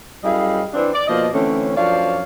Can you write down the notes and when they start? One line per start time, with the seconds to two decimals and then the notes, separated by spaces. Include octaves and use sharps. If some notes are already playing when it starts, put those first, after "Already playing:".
0.23 F#2 G3 E4 G#4 D#5 F5
0.74 E3 C4 D4
0.94 D5
1.08 B2 F3 A#3 D#5
1.33 D3 E3 A3 C4 C#4
1.77 F#2 F3 D4 C#5 D5 F5